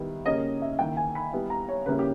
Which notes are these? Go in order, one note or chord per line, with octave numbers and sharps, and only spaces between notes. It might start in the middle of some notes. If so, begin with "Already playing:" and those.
Already playing: D#3 G3 B3 E4
C#3 G3 A#3 C#4 D#5
E5
D#3 A#3 E4 G5
G#5
B5
G3 B3 E4
A#5
C#5
C#3 G3 A#3 C#4 E4 B4
G4